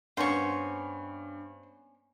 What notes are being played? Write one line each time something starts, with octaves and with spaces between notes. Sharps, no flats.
G2 A#3 B3 C#4 C5 C#6